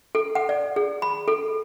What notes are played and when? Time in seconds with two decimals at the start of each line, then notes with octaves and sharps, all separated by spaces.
0.15 A4
0.35 F#5
0.49 D5
0.76 G#4
1.02 B5
1.28 A4